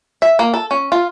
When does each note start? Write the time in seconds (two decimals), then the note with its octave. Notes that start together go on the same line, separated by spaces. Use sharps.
0.22 E5
0.39 A#3
0.54 A4
0.71 C#4
0.92 F4